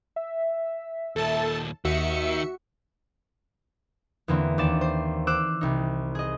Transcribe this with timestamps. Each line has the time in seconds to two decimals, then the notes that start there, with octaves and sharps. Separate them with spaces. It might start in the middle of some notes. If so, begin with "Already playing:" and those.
0.16 E5
1.16 D#2 A#2 A4 A5
1.85 D#2 D#3 F#4 E5 C#7
4.28 E2 D3 A#3 C4 E4
4.58 D#2 E3 D5 A6 E7
4.81 C5 C6
5.27 C5 D6 E6 F#6
5.61 C2 D#4
6.15 G#4 D#5